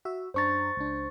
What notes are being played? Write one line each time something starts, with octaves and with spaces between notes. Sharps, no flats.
F#4 E5
F#2 D4 C5 A#5 C#6 A6
C#2 D4